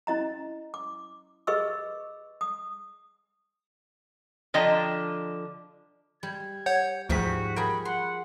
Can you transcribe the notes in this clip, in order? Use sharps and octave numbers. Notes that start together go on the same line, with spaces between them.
C#4 E4 D#5 A#5
D6
G#4 B4 D#5 C#6 E6
D#6
D3 F3 D4 D#5 G5 A#5
G3 G#6
C#5 F#5 G6
D2 G#2 F3 G3 F#4 B6
G#4 A#4 G5 B5
F#5 C6